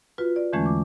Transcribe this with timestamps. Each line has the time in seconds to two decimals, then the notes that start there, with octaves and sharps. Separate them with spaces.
0.18 F4 F#4 B4
0.36 D5
0.53 E2 D3 E3 G#3 A3 C#4
0.66 D6